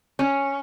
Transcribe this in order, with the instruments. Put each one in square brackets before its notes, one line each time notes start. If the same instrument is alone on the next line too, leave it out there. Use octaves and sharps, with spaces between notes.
[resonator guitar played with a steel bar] C#4